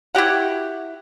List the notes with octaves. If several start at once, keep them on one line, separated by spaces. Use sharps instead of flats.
E4 F#4 G4 F#5